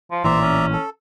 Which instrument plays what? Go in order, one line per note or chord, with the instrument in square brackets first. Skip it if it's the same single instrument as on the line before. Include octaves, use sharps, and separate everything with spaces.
[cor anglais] F3
[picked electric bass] A1 A#2 E3 [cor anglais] C5 [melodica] D5 E5 A#5
[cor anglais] C#4
[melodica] A4